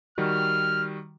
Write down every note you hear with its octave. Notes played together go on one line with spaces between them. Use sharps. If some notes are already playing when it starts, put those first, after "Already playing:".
D#3 G3 F#4 F6